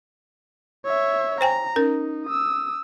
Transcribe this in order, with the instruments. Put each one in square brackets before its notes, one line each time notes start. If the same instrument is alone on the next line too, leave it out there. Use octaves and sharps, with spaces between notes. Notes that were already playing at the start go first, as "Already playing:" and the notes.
[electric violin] C#5 E5
[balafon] C5 G5 G#5 [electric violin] A#5
[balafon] C#4 A#4 [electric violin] D#4
[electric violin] D#6 E6